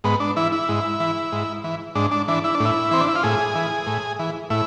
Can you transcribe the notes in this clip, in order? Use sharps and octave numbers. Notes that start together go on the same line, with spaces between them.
G#2 B3
D4
E3 E4
E4
G#2
E3
G#2
E3
G#2 D4
D4
E3 D4
E4
D4
A2
E4
E3 C4
D4
E4
F4
A2 G#4
E3
A2
E3
A2 E4